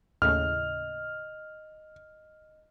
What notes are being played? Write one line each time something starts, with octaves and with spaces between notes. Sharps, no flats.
D#2 A2 C#3 D#5 F6